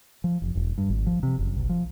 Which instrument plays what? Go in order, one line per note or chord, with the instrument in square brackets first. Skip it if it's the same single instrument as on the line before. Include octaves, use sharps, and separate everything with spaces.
[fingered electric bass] F3
F1
E1
G2
G#1
F3
C3
F#1
B1
F3